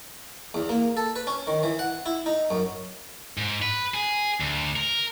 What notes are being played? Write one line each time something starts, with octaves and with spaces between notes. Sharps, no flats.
E2
A#3
A4
B4
C#4
D#3
E3
F#5
E4
D#4
F#2
G#2
B4
G#4
D2
A#4